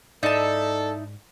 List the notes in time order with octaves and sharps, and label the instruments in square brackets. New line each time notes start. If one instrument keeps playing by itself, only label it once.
[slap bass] G#2 [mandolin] D#4 E4 A5 [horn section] A4 [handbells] D5